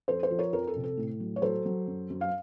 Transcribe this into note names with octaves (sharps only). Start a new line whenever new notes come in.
F2 A4 C5
A4 C5
F3
A#4 C#5
F2 A#4
A4
C3
A4
A2
F#3
C#5
F#3 A4 C5
F#3
F#2
F#2
F5